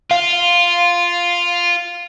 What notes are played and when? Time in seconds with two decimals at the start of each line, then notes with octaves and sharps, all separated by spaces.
0.11 F4 F5